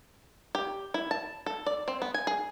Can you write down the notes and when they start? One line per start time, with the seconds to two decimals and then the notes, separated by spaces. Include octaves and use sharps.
0.55 G4
0.94 E4
1.11 A5
1.46 A4
1.66 D5
1.88 C4
2.02 B3
2.14 G#5
2.27 G#4